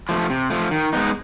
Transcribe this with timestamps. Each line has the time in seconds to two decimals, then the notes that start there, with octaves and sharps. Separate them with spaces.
0.09 F3 A3
0.30 C3
0.50 F3 A3
0.71 D#3
0.93 G#3 B3 D#4